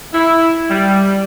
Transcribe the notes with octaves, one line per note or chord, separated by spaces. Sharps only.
E4
G3